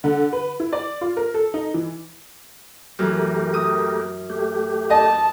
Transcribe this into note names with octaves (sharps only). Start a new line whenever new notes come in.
D3
B4
E4
D5
F4
A#4
A4
D#4
E3
F#2 E3 A3 G4 A#4
D#6
A3 G4
D#5 A5